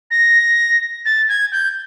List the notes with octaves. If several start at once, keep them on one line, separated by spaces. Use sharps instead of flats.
A#6
A6
G#6
G6